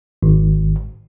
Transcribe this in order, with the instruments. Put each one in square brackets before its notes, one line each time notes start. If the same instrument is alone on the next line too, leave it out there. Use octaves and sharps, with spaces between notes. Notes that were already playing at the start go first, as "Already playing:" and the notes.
[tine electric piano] G#1